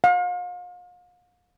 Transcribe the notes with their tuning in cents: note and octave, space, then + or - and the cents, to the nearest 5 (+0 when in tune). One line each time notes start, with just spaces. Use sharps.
F5 +40